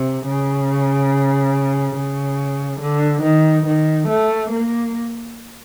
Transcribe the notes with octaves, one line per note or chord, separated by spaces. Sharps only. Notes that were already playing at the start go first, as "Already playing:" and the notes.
Already playing: C3
C#3
C#3
D3
D#3
D#3
A3
A#3